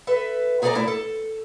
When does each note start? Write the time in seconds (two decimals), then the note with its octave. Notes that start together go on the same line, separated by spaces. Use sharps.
0.07 A4 B4 E5
0.62 C3 G#4 A4 B4 D5 A#5
0.75 A2 E4
0.88 A4